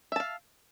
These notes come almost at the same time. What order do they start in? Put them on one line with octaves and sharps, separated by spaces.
E5 A5 F5